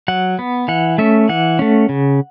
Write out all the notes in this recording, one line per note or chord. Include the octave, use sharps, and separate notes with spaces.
F#3 F#5
B3
E3 F#5
A3 C#4 E5
E3 F#5
A3 C#4
C#3